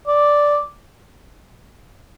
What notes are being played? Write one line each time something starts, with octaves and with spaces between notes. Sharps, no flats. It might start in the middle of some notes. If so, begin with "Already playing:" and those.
D5